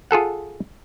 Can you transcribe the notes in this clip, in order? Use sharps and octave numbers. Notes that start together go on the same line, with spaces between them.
F4 G#4 A4 F#5